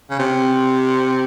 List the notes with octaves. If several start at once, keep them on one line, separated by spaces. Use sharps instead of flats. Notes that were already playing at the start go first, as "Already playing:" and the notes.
C#3
C3